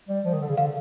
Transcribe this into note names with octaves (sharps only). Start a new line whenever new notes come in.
G3
F3
D#3
D3
C#3
D3 F5